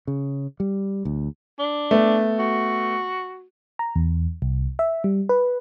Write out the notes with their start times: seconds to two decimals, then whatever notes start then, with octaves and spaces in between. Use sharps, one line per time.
0.07 C#3
0.60 G3
1.05 D2
1.59 D4
1.91 A3 B3
2.39 F#4
3.79 A#5
3.96 E2
4.42 C2
4.79 E5
5.04 G3
5.29 B4